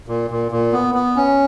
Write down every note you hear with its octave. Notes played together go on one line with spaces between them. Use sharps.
A#2
A#2
A#2
B3
B3
C#4